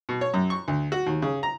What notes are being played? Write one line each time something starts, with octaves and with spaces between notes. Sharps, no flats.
B2
C#5
F#2
C#6
D2
F#4
D#2
C#3
A#5